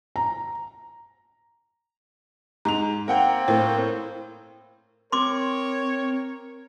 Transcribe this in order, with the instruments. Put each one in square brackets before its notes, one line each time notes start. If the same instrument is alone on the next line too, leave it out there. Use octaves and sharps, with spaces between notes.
[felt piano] A#5
[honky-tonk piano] G#2 F7 [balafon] A#5
[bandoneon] A#3 C4 [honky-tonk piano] A#4 F#5 G5
[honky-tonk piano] A2 [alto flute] A#4 [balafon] C5
[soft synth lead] C4 [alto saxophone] A#4 [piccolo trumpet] C#5 [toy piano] C6 D6